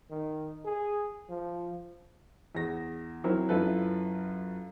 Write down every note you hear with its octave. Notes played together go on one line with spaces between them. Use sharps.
D#3
G#4
F3
E2 G#4 A#6
F#3 C4 E4 A#4
F#2 E4 F4 A4 B4